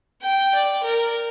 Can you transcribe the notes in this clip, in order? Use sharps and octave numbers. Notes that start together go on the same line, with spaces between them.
G5
D5
A#4